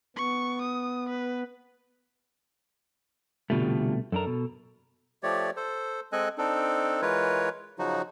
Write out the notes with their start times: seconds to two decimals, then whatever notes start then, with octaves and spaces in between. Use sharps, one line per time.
0.16 B3 C#6
0.62 D#6
1.09 B4
3.50 C2 B2 D3 A3 F4 G4
4.12 F#2 D4 A4 A#4
4.27 B2
5.23 F3 A3 G4 C#5 D5
5.57 A4 C5
6.12 G#3 C4 A4 D#5 G#5 F#6
6.38 C4 D4 D#4 A4
7.02 E3 G#3 F4 A#4 B4 C#5
7.79 C#3 F3 F#3 D#4 F#4